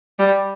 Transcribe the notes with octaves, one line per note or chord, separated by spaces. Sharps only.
G3